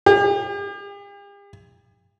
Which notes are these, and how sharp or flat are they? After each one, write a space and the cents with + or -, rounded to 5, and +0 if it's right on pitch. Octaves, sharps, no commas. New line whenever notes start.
G4 +45